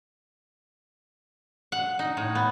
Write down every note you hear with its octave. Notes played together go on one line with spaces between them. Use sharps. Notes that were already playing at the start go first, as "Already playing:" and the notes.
F#5
D#4
A2
B3